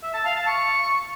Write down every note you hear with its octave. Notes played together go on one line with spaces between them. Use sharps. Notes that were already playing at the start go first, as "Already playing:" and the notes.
E5
A5
F5
A5
C#6